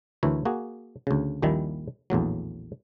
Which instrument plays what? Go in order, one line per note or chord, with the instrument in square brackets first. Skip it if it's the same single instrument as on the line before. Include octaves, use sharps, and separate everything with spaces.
[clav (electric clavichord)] D2 E3 E4 A#4 C#5
A#3 F#4 G#4
D2 C#3
A#1 D#2 A#2 D#3 G3 E4
A#1 E2 A2 F#3